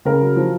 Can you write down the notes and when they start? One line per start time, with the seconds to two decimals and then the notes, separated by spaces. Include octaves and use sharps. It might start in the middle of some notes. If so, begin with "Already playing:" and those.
0.05 C#3 A#4
0.21 F#3
0.36 F3